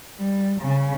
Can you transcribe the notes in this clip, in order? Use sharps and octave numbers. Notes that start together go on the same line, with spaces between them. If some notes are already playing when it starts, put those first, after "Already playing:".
G3
C#3